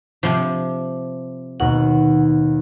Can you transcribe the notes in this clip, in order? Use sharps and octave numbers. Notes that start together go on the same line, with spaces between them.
C3 F3
D#2 B2 D#3 F#5